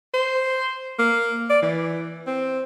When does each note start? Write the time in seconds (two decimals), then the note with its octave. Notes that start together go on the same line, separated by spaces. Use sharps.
0.14 C5
0.99 A#3
1.50 D5
1.62 E3
2.27 C4